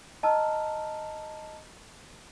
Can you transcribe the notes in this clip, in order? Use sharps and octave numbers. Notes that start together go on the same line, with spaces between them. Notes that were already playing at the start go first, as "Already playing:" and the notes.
D#5 A5 A#5 E6 F6